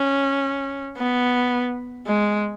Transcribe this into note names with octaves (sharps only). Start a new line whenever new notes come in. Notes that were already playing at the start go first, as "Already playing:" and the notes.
Already playing: C#4
B3
G#3